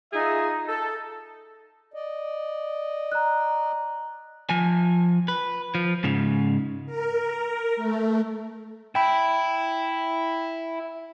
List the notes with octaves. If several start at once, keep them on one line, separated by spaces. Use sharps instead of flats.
D#4 F4 G#4 E5
A4
D5 D#5
A#5 F#6
F3 G#5
B4
F3
G#2 C#3
A#4
A3
E4 G5 B5